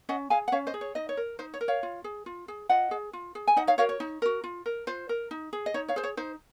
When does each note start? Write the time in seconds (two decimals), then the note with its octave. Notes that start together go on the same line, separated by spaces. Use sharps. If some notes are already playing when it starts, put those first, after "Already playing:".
0.09 C#4 D#5 F#5
0.30 G#4 F5 G#5
0.48 F#5
0.52 C#4 C#5 F5
0.67 C5 D#5
0.74 G#4
0.81 C#5
0.95 D#4 D#5
1.09 C#5
1.17 A#4
1.39 D#4 C5
1.54 C#5
1.61 A#4
1.68 C#5 F5
1.83 F4
2.04 G#4
2.26 F4
2.48 G#4
2.69 F4 D#5 F#5
2.91 G#4
3.13 F4
3.35 G#4
3.47 G#5
3.56 D#4 D#5 F#5
3.67 C#5 F5
3.78 F#4 A#4 C#5 F5
3.89 C#5
4.00 D#4
4.22 F#4 A#4
4.44 F4
4.66 A#4
4.87 F4 C5
5.09 A#4
5.31 D#4
5.53 G#4
5.66 D#5
5.74 D#4 C#5
5.88 C#5 F5
5.96 G#4 C5
6.04 C#5
6.17 D#4 C5